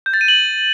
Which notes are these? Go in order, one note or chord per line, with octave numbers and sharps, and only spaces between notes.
G6
A6
D#7
F#7